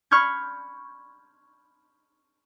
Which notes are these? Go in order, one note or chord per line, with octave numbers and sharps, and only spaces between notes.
B5 C#6 F6 G6 G#6